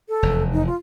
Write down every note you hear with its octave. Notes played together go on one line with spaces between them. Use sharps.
A4
F1 E2
D#4
F4